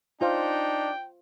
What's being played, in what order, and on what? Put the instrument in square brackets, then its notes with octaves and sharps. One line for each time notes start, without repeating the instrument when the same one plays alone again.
[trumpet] D4 [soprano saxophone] D#4 [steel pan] F4 C5 F5 [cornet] G5